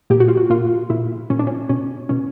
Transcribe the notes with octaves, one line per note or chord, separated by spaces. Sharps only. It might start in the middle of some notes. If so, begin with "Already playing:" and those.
A#2 G4
F#4
F4
F#4
A#2 F4
A#2 E4
A#2 C#4
D4
C#4
B2 C#4
B2 C#4